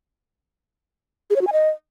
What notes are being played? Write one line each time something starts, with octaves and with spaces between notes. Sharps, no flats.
G#4
C#5
F#4
G#5
D#5